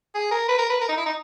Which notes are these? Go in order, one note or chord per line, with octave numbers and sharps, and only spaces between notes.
G#4
A#4
B4
A#4
B4
A#4
D#4
E4
D#4